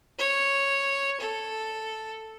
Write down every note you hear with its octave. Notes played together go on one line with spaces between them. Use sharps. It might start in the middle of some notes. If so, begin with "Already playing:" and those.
C#5
A4